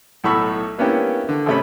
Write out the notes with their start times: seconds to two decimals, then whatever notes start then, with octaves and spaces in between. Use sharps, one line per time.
0.24 B1 A2 A4 B5 C#6 E6
0.79 A#3 B3 C#4 D4 E4 G4
1.29 D3
1.46 G#1 C3 A3 C#4 B5